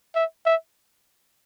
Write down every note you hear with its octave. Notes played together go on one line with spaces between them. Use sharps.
E5
E5